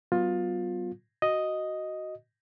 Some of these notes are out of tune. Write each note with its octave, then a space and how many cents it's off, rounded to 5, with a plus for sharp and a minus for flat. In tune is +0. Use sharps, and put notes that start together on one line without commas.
F#3 +40 B3 +10 F4 +20
F#4 +5 D#5 +0